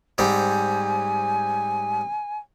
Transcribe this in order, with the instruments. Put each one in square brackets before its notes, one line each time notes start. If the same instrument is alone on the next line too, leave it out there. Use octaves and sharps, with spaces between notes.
[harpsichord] G#2 G3 C4 [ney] G#5